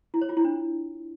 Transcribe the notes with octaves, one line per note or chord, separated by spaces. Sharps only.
E4
C#5
F4
E4
D4